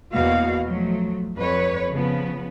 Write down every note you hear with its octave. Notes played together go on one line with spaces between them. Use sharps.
E2 B2 A#3 F#4 F5
F3 F#3 A3
F2 B4 C#5
C#3 F3 B3